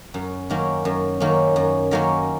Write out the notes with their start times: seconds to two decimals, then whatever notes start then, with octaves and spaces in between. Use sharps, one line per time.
0.14 F#2
0.50 D#3 F#3 A#3 C#4
0.85 F#2
1.20 D#3 F#3 A#3 C#4
1.56 F#2
1.91 D#3 F#3 A#3 C#4